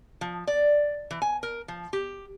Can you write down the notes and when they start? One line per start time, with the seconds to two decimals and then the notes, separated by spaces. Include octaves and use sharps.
0.21 F3
0.47 D5
1.11 E3
1.22 G#5
1.43 A#4
1.68 F3
1.93 G4